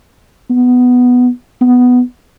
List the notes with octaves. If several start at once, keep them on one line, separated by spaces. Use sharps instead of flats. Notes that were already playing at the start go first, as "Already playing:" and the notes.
B3
B3